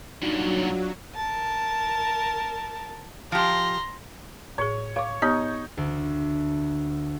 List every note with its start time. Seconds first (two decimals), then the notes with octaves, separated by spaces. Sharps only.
0.22 G2 A#2 F#3 D4 D#4 F4 F#4
1.15 A#4 A5
3.32 F3 G4 A#5 C6
4.58 A2 G#4 C#5
4.96 C#5 F5 D6
5.22 B3 D#4 G4 C#5
5.77 D2